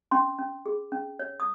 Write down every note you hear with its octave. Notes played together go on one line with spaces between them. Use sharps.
C#4 C6
C#4
G#4
C#4
C#5
D#6